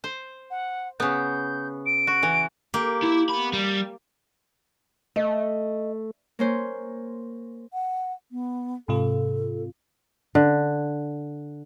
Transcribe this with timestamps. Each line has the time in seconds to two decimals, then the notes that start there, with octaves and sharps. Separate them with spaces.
0.04 C5
0.51 F#5
1.00 C#3 B3 G6
1.86 D7
2.07 F#4
2.23 E3
2.74 A#3 G4
3.02 E4
3.29 B3 B5
3.53 G3
5.16 A3 D#5
6.39 A#3 C#4 C5
7.72 F#5
8.32 B3
8.88 G#2 C3 F4 A4
10.35 D3